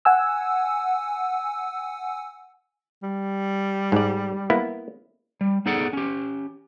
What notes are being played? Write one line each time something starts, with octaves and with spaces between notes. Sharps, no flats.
F#5 G#5 E6
G3
G#2 D5
A#3 B3 E4
G3
B3 D#4 G#4 A4 D5 F#5
C#4 G4